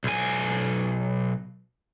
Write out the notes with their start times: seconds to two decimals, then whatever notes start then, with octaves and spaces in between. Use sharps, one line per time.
0.04 B1 G#5